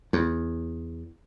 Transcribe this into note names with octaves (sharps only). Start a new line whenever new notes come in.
E2